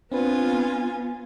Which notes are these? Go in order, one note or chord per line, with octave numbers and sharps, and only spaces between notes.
B3 C4 D4 F4 B4 G#5